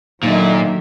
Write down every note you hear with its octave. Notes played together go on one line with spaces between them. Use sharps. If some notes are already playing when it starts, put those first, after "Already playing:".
A#2 D3 D#3 F#3 D#4 E5